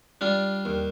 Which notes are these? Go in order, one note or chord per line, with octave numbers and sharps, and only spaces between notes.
G3 D4 F4
D#2